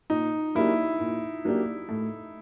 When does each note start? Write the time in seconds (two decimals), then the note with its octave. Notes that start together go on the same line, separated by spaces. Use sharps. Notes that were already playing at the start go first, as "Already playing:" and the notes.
0.10 A#2 D#4
0.55 F#3 A#3 D4 E4 G4
1.00 A#2
1.45 F#3 A#3 D4 G4
1.89 A2